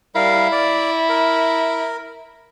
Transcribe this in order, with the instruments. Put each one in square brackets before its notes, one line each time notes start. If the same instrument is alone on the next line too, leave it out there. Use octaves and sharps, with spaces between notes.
[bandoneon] G3 A#4 F5 [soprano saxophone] E4
[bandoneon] D5
A#4